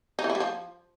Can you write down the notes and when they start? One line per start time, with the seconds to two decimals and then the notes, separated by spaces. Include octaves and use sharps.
0.19 D#4
0.24 E3
0.30 E4
0.35 G3
0.40 F3